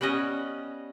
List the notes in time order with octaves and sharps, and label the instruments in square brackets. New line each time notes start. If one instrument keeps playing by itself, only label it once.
[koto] G3 B3 C#4 D#5